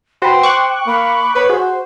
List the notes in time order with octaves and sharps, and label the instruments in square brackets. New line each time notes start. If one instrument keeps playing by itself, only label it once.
[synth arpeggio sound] F#4 B4 [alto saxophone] C5 [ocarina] G5
[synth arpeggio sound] C#6 D6 F#6
[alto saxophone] A#3 [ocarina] B5
[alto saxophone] B4 [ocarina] C#5
[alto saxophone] F#4 [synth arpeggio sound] G#4 [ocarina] C5